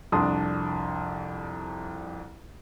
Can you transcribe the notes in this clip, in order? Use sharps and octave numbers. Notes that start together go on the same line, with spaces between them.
C2 F2 D4 A5 C6 D#6